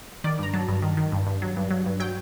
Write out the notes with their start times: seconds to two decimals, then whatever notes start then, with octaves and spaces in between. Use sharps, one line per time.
0.24 D#3 D5
0.39 G2 A#5
0.53 F#3 A5
0.68 G2
0.82 D#3
0.97 D#3
1.12 G2
1.27 G2
1.42 F#3
1.56 G2
1.71 F#3
1.86 G2
2.00 F#3 G5